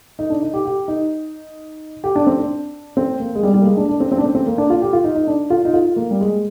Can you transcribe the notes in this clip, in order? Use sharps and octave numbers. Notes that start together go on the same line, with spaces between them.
D#4
D4
D#4
G4
G4
D#4
G4
D4
C4
D4
C4
A#3
G#3
G3
G3
A#3
G#3
D4
D4
C4
C4
D4
C4
C4
A#3
D4
F4
G4
F4
D#4
D#4
D4
F4
D#4
F4
A#3
G3
G#3